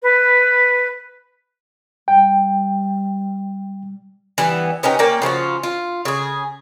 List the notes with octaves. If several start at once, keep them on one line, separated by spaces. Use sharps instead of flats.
B4
G3 G5
E3 G3 B3
B3 C#4 D#4 G4
A#3 C#4 D5 G5
C#3 F3 F4 F#4
F4
C#3 G#4